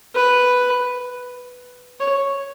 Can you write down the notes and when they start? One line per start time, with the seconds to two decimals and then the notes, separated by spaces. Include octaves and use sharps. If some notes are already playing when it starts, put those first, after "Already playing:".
0.15 B4
2.00 C#5